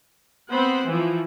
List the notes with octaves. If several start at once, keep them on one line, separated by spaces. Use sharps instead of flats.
B3 C4 C5 F#5 B5
E3 F3